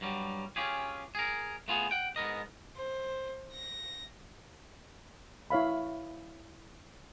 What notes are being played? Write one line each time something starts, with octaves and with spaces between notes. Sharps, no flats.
G2 F#3 G3
C#4 F4 G4 G#4
G#4 A#4
A3 B3 F4 G#4
F#5 G5
G#2 B3 A#4 D#5
C5
A#6
E4 C#5 F5 B5